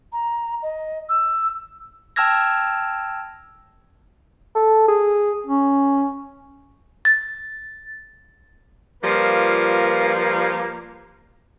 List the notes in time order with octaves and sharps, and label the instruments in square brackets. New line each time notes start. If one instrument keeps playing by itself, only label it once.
[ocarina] A#5
D#5
E6
[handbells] G5 A5 E6 F6 G#6 A#6
[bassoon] A4
G#4
[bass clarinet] C#4
[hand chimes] A6
[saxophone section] F3 G3 A#3 F4 B4